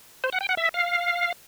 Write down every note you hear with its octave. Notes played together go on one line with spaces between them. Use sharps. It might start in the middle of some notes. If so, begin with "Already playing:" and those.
C5
F#5
G5
F#5
E5
F5